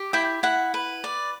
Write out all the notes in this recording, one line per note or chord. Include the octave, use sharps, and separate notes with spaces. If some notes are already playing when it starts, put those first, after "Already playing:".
Already playing: G4
E4 G5
E4 F#5
B4
D5